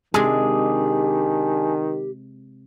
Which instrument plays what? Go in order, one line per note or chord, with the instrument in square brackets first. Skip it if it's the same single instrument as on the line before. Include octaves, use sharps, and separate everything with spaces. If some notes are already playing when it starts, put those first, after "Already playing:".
[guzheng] C3 G#3 [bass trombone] D#3 [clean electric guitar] D4 G#4 [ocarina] G4